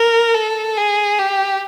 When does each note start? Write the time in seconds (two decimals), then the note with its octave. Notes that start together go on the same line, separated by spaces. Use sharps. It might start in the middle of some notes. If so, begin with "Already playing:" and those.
Already playing: A#4
0.35 A4
0.77 G#4
1.18 G4